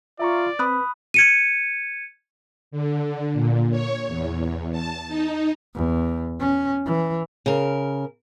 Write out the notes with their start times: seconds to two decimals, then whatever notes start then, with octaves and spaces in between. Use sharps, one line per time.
0.19 F4 D5 E5 A#5 C#6
0.59 C4 B4 B5 D#6 F#6
1.14 G#6 C#7 D#7
2.71 D3
3.33 A#2
3.71 C#5
4.08 E2
4.72 A5
5.08 D#4
5.75 E2
6.40 C#4
6.86 E3
7.46 C#3 A#4